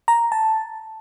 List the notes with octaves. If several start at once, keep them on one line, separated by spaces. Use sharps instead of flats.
A#5
A5